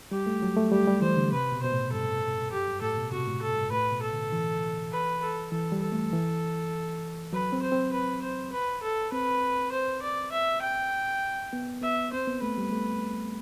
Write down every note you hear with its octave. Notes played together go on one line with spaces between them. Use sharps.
G3 G4
A3
F#3
A3
G3 G4
G3
E3 C5
D3
C3 B4
B2
B2 C5
A2
G2 A4
F#2 G4
G2
A2 A4
B2
C3 F#4
A2
A4
G2
A2 B4
B2
A4
D3
E3
B4
A4
E3 A4
G3
A4
A3
E3
F#3 B4
C4
C5
C4
B4
C5
B4
A4
C4 B4
C5
D5
E5
G5
B3
B3 E5
C4 C5
B3
A3 B4
G3
A3